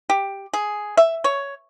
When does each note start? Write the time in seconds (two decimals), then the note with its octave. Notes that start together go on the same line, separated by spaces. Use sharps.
0.10 G4
0.53 G#4
0.97 E5
1.24 C#5